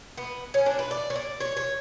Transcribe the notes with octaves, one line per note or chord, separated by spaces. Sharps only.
B3
C#4
D4
B4
D5
C#5
D5
C#5
C#5